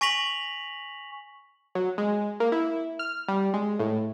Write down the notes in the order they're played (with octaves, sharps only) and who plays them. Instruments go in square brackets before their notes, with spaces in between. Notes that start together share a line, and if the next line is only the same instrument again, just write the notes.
[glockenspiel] G#5 C#6 A#6 B6 F7 F#7
[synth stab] F#3
G#3
A#3
E4
F6
G3
G#3
A2